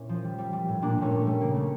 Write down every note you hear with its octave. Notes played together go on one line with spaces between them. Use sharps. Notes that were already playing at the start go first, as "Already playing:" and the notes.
Already playing: A#2 C#4 E4
F3
G3
G3
G3
A2
A#2 A#3 D4
A#2 A3 C#4
A#2
A3
G3
C#3 A#3
G3 A3